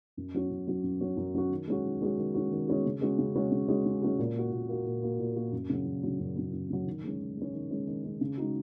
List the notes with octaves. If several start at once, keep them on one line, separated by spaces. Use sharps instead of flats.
F#2
F#3 C#4 F#4
F#2
F#3 C#4 F#4
F#2
F#3 C#4 F#4
F#2
F#3 C#4 F#4
D#3
G#3 C#4 F#4
D#3
G#3 C#4 F#4
D#3
G#3 C#4 F#4
D#3
G#3 C#4 F#4
C#3
G#3 C#4 F#4
C#3
G#3 C#4 F#4
C#3
G#3 C#4 F#4
C#3
G#3 C#4 F#4
A#2
A#3 F#4
A#2
A#3 F#4
A#2
A#3 F#4
A#2
A#3 F#4
F#2
C#3 F#3
F#2
C#3 F#3
F#2
C#3 F#3
F#2
C#3 F#3
D#3
G#3 C#4
D#3
G#3 C#4
D#3
G#3 C#4
D#3
G#3 C#4
C#3
G#3 D#4 F#4